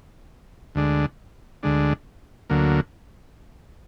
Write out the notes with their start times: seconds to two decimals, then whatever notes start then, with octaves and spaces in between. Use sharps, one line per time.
0.75 D2 D3 G#3 D4
1.63 D2 D3 G#3 D4
2.50 D2 D3 F#3 A#3